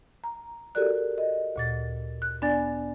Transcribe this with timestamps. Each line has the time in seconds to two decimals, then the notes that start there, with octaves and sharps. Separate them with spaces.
0.24 A#5
0.75 F#4 G4 A4 A#4 D5 F#6
1.18 D#5
1.56 D2 A#2 A6
2.22 F#6
2.42 B3 D4 D5 G#5 A6